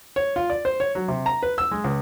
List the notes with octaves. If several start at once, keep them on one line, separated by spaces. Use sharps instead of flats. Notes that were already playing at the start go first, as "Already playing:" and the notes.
C#5
F4
D5
C5
C#5
F#3
C3
A#5
B4
E6
G#3
C#2